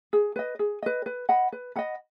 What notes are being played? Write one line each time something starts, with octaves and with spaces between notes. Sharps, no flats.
G#4
B4 D#5
G#4
B4 D#5
B4
D#5 F#5 B5
B4
D#5 F#5 B5